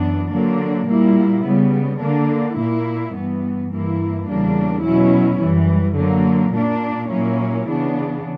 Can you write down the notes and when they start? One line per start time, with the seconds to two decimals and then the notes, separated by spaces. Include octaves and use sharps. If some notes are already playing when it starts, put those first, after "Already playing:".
Already playing: F#2 E3 B3 D4
0.31 D3 F#3 A#3 D4
0.87 A#2 G3 A#3 E4
1.44 C#3 G3 B3
2.01 D3 A#3 D4
2.57 A#2 A#3 E4
3.14 G2 E3 B3
3.70 G2 E3 A#3 E4
4.27 E2 C#3 G3 A#3 D4
4.83 B2 F#3 C#4 E4
5.40 F#2 E3 G3
5.97 D3 F#3 A#3
6.53 A#2 A#3 D4
7.09 A#2 F#3 A#3 C#4 E4
7.66 C#3 E3 B3 D4